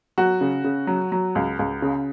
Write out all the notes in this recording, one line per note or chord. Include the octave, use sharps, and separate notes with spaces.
F#3 F#4
C#3
C#3
F#3
F#3
C#2
C#2
C#3